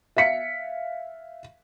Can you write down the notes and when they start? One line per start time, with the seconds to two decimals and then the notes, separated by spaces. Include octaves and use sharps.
0.17 E5 F5 B6 C#7